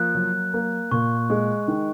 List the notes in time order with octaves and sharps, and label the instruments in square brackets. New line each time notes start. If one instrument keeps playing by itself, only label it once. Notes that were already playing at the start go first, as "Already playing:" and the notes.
Already playing: [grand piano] F3 A#3 [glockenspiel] F#6
[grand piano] F#3
A#3
[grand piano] A#2 [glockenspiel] C#6
[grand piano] G#3
D#3